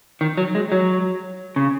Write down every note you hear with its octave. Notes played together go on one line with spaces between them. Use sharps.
D#3
F#3
G#3
F#3
C#3